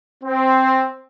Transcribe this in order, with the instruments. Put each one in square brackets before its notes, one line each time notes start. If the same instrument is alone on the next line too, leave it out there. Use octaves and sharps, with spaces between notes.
[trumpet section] C4